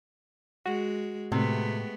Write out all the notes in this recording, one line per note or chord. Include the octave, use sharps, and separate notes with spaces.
G#3 F#4
A2 C3 G#3 A3 B3